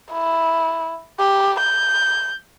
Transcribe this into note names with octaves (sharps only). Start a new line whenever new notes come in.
E4
G4
G6